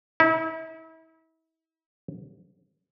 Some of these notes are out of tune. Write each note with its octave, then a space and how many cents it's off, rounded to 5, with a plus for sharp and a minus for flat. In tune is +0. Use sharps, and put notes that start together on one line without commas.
E4 -35